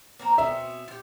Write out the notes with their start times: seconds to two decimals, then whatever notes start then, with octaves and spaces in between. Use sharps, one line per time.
0.19 A#3 C4 A#4
0.38 B2 C4 C#4 E5
0.88 F4 G4